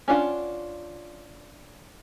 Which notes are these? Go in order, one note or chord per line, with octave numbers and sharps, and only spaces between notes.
C#4 D4 F4 F#5